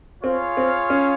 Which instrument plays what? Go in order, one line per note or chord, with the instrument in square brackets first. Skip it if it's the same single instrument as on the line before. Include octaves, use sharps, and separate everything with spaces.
[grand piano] C4 [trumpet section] F4 G#4 C#5 F5
[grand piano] C4
C#4